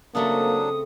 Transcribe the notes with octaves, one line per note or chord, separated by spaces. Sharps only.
C#3 F#3 A3 A#3 C4 D4 D#6